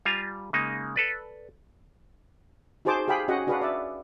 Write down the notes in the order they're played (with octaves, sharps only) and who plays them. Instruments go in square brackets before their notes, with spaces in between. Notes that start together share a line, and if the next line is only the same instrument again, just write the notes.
[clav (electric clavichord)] G3 F4 F5 G#5 A#5
C#3 G#3 A#3 D#4
A4 B4 D5
[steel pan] D#4 F#4 G#4 C5 A5 D6
G4 G#4 F5 G5 B5
C#4 F#4 G#4 D#5 F#5
D4 F#4 G#4 B4 F5 F#5
D5 E5